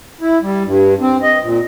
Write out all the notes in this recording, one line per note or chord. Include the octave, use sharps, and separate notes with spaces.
E4
G3
G2
C4
D#5
A#2